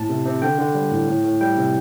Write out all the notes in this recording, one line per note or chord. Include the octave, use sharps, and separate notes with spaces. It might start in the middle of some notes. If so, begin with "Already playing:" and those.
Already playing: A2 A5
C3
C3
D3 G5
D3
G3
A2
A2
A2
G3 G5
C3